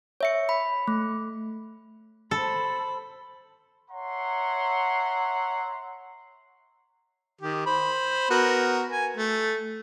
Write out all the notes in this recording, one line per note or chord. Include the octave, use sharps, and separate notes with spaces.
C#5 E5 C#7
B5
A3
A4 C5 B5
C#5 E5 F#5 A#5 C6
D#3 G4
C5 B5
B3 F#4 A#4
G#5
A3